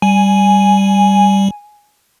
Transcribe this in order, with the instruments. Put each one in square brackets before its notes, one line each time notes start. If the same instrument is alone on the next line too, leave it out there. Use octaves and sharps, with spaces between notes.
[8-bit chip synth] G3 [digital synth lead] G#5